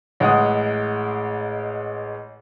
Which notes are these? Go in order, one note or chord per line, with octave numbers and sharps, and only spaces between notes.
A1 G#3 F#5 D#6